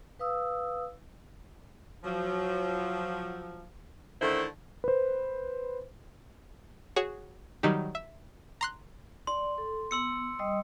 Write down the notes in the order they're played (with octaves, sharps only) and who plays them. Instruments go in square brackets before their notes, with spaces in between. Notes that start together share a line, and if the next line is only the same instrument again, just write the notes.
[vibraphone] B4 F5 D#6 E6
[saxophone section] F3 F#3
D3 D#3 A3 E4 A4 C5
[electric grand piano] B4 C5
[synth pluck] F#4 G#4 C#5
D#3 F#3 G3 D#4 G4
E5
A#5 C6 F#6
[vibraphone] D5 [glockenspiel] C6
[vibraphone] A4
[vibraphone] B3 [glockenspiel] C6 E6 C#7
[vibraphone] G3 D#5 D#6